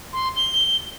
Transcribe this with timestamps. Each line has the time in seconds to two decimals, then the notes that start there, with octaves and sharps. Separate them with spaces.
0.13 C6
0.36 G7